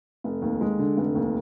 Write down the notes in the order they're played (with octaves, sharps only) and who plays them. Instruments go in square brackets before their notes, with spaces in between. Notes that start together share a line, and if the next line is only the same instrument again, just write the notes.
[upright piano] F1
D#2
G#3
D3
F1
D#2